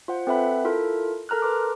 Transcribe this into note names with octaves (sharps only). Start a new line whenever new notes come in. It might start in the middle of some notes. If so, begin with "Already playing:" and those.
F4 C5 F#5
C4 A4 B4 E5 F#5 B5
E4 F4 A4 A#4
A4 A#4 A#5 F6 F#6
B4 C6 D6